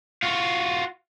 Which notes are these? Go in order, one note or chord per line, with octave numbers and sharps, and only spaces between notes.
F4 F#4